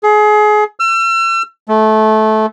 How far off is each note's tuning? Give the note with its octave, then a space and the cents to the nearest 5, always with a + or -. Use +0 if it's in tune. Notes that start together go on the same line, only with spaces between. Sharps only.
G#4 +25
E6 +40
A3 -20